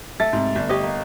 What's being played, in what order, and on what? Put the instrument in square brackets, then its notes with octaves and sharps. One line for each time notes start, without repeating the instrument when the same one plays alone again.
[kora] A3 [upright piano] A6
[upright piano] G#2 C3
G1
[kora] G4 C#5 D#5
A#3